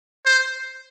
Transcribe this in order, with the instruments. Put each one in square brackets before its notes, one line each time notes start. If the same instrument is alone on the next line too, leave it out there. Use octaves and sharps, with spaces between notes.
[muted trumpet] C5